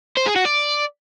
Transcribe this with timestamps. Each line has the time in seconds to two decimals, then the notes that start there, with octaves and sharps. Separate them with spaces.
0.17 C5
0.26 G#4
0.36 F#4
0.45 D5